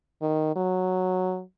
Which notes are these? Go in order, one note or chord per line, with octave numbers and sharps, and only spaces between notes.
D#3
F#3